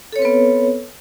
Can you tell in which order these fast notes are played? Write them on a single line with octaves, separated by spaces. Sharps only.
A4 C#5 C4 B4 B3